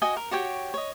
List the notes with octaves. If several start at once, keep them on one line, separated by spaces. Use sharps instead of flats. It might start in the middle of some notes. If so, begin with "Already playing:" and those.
F#4 D#5 G5 G#5
A#4
F#4 G4 C#5 G5
C#5 D#5